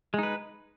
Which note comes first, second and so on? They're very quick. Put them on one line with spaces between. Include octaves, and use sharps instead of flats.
G#3 D#4 B4